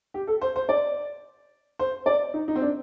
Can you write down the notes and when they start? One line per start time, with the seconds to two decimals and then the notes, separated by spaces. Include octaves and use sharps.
0.14 G4
0.27 A4
0.41 C5
0.56 C5
0.69 D5
1.79 C5
2.06 D5
2.34 D#4
2.48 D#4
2.55 C4
2.62 D4